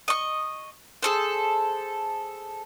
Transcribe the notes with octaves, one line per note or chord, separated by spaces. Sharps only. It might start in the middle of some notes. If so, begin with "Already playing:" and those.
D#5 C#6
G#4 A4 C5